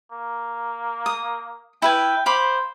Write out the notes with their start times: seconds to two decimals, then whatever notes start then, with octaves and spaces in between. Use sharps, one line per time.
0.12 A#3
1.06 D#6
1.82 E4 B4 G5 G#5
2.26 C5 F5 B5 D6